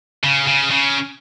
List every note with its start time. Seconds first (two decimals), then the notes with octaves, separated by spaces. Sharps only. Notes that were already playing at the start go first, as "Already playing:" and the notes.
0.24 C#3
0.47 C#3
0.71 C#3